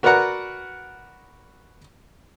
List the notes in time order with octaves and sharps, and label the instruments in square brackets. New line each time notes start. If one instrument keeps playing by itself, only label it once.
[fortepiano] F#4 A#4 B4 D5 F#5 A#5